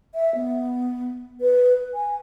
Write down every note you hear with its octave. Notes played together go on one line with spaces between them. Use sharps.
E5
B3
B4
G#5